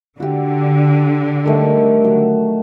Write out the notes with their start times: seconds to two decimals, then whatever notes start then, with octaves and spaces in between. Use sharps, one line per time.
0.20 D3 F#4 G4
1.46 D#3 G3 A3
2.04 F#3